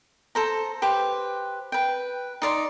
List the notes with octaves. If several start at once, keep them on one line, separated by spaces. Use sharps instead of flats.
A4 C5 A#5
G4 B4 C5
B4 G5
D#4 D5 C6